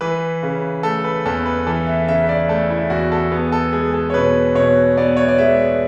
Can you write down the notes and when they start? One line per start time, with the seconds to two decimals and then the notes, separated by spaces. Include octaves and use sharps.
0.01 E3 B4
0.43 C#3
0.83 A3 A4
1.04 B4
1.25 E2 A4
1.46 B4
1.67 E3 A4
1.87 E5
2.08 C#3 E5
2.29 D5
2.49 A3 A4
2.70 E4
2.90 E2 F#4
3.12 A4
3.31 B3 G#4
3.52 A4
3.73 G#3 G#4
3.94 A4
4.10 C#5
4.14 B2 B4
4.55 B2 C#5
4.97 B3 D5
5.17 C#5
5.28 D5
5.38 G#3 E5